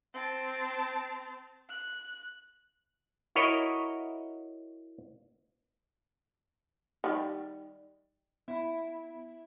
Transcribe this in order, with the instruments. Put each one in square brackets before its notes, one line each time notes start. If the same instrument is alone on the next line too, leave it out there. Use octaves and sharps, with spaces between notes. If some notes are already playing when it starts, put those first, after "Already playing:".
[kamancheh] C4 A5
F#6
[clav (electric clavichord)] E4 F#4 A#4 C#5 D#5
[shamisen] D#3 G3
[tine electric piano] B3 [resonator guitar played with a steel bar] E4